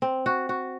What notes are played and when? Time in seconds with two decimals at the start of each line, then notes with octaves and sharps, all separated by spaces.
0.02 C4
0.26 F#4
0.49 F#4